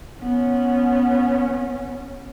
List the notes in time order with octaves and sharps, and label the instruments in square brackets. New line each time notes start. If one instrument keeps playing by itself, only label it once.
[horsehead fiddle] B3 C#4